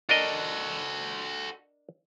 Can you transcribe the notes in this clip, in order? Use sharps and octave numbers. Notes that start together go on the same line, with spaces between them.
D4 F#4 A4 A#4 D#5